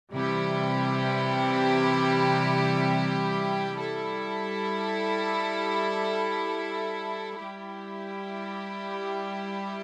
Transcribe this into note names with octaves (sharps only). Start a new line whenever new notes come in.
C3 E3 G3 E4 G4
G3 E4 A4
G3 E4 G4